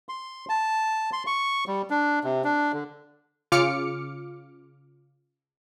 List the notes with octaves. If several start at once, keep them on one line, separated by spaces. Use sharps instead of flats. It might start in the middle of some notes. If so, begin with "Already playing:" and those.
C6
A5
C6
C#6
G3
D4
C3
D4
D3
C#3 F4 D6 F6 C#7